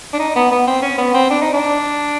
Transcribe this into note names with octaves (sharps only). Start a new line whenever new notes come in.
D4
D#4
B3
B3
C4
C#4
B3
C4
D4
D#4
D4